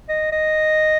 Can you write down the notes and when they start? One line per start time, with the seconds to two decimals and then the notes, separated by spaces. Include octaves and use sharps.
0.09 D#5
0.32 D#5